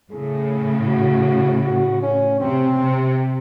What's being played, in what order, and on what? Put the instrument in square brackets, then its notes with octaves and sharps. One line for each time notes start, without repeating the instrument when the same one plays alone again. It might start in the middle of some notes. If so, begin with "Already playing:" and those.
[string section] A2 C#3 [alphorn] G#4
[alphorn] F#4
F#4
C#4
[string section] C3 [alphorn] C4
[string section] C3